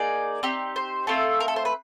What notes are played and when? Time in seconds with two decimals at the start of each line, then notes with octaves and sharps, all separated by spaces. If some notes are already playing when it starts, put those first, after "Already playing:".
Already playing: A#3 D#4 G#4 D5
0.43 C4 D#4 G4
0.76 C5
1.07 A3 C4 F4 A4
1.40 A#4
1.48 A4
1.56 C5
1.65 B4